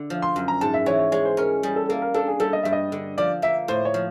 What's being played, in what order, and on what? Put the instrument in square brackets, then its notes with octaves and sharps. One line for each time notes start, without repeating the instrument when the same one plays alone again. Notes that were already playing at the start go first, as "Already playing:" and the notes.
Already playing: [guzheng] D3
F3
[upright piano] C6
[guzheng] F#2
[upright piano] A#5
[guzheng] G#2 [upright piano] A5
[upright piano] E5
[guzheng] E3 [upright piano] C#5
[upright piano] C#5
[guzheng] G#3 [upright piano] C#5
[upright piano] C5
[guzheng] C#4 [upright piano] A#4
[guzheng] G3 [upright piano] G#4
[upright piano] A4
[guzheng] A#3 [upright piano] A4
[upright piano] A#4
[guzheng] D4 [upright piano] A4
[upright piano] G#4
[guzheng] G3 [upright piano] A4
[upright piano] D#5
[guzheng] G2 [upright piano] E5
[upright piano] D#5
[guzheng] D3
[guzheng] F3 [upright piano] D5
[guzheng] A#3 [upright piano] E5
[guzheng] A2 [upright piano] C5
[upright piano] C#5
[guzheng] F3